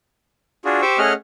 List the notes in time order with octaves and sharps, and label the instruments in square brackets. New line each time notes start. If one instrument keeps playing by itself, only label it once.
[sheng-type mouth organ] D4 F4 F#4 G#4
G4 C5 C#6 D6 E6
A3 C#4 G#4 D#5 F#5 F6